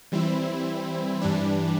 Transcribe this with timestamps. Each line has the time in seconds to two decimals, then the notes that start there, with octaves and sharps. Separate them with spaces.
0.12 E3 G3 C4 E4
1.22 G2 E3 G3 D4